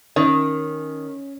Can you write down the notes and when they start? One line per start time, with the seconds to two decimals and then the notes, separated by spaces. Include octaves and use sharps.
0.16 D#3 C#4